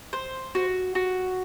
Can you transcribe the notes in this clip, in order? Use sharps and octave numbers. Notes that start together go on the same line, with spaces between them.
C5
F#4
F#4